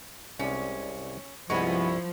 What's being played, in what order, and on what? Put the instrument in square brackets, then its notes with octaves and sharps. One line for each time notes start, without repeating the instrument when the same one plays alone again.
[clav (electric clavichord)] C2 G#3 D5 [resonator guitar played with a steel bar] C#4
[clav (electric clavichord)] C2 G2 [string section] F3 [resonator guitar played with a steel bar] G#3 B3 [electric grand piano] E4 B5 C#6